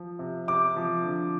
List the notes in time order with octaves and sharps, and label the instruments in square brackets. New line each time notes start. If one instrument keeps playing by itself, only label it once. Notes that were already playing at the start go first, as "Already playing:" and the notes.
Already playing: [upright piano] F3
C3
C3 D6
F3
D3